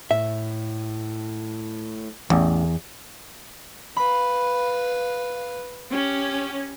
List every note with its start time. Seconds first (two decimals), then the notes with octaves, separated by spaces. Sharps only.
0.11 A2 E5
2.30 A1 E2
3.97 B4 F5 B5
5.93 C#4 G4